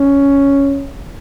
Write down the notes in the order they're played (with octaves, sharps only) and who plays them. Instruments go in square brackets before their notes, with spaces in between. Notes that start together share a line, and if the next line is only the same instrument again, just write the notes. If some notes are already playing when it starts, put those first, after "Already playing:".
Already playing: [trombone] C#4